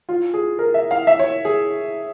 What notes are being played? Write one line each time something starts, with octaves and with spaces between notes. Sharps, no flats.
F4
G#4
A#4
E5
F5
E5
C#5
G#4